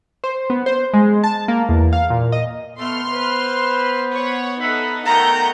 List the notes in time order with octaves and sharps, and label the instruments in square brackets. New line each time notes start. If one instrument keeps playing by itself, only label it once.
[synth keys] C5
B3
C5
G#3
A5
A#3
E2
F5
A#2
D#5
[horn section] A3 [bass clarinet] B3 [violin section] C6 F6
[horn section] B4 C5
[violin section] C#5 F#5
[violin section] D#4 A4 [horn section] E5 F#5 B5
[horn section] D#3 A3 [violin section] F#5 G6 [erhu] A#5